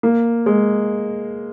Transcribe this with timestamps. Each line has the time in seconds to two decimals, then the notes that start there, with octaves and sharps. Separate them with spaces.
0.03 A#3
0.46 G#3